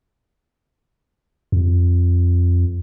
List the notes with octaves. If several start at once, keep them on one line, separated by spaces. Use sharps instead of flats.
F2